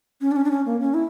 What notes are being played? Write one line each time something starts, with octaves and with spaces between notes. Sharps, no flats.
C#4
D4
C#4
D4
C#4
A#3
C#4
E4